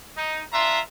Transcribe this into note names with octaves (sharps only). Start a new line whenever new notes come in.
D#4
D4 F4 E5 A#5 C6